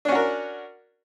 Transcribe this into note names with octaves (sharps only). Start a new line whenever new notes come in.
C#4 D4 F#4 A#4